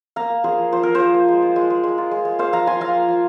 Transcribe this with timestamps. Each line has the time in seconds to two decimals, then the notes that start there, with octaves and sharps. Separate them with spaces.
0.16 A#3 F5 A#5
0.30 A#3
0.44 F3 G#4 C5
0.58 F3
0.72 F3 C5
0.83 F3 A#4
0.94 G#4 C5
1.00 F3
1.14 A#3
1.28 G#3
1.42 F4
1.56 G#3
1.70 G#3
1.84 G#3
1.98 F4
2.11 G#3
2.25 G#3
2.39 A#3 C5 F5
2.53 F3 F5 A#5
2.67 F4 G#5 C6
2.81 F4 F5 A#5
2.95 A#3
3.08 F3